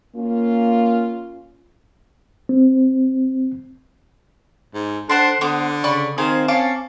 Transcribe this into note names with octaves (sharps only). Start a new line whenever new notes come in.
A#3 C#4 F4
C4
G#2
D4 A4 C5 F#5 C6
D3 B3 C5 D6
C#3 D5 B5 C#6
D#3 C4 G#4 C5 F5
C#4 F5 A5 D6